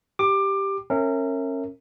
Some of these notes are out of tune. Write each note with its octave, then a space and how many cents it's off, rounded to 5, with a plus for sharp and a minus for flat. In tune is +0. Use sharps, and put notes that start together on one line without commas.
G4 +0 D6 +20
C#4 -25 A#4 -30 E5 -5